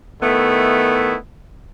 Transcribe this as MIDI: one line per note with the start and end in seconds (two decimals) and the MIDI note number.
0.22 1.15 51
0.22 1.15 57
0.22 1.15 59
0.22 1.15 64